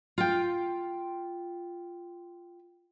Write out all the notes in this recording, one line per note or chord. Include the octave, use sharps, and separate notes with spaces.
F4 G5